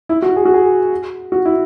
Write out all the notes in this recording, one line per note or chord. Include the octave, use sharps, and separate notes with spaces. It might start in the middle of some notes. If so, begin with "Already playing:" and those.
E4
F#4
G#4
F#4
G#4
F#4
E4